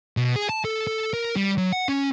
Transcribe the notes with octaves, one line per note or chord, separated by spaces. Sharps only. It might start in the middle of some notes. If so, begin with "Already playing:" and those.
B2
G#4
A5
A4
A4
A#4
G3
F#3
F#5
C#4